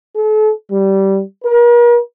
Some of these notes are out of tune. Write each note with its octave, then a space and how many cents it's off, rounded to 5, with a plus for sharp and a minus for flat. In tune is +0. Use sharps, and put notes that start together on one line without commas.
A4 -40
G3 -15
A#4 +40